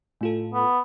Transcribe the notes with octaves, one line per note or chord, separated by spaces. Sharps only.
A2 F4 A4
B3